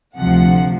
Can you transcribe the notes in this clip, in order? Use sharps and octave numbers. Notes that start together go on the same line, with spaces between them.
D2 C3 F3 F#5